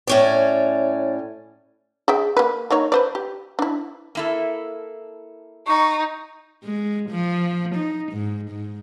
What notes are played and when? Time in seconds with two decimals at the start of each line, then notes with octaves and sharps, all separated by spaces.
0.07 A2 C#4 D5
2.08 G#4 E5 G5
2.37 A#3 B4
2.70 A#3 D#4 C#5
2.92 B4 C5 D5
3.15 G4
3.59 D4 E4
4.15 A#3 E4 A4
5.67 D#4 C#6
6.64 G#3
7.10 F3
7.75 D#4
8.12 G#2
8.51 G#2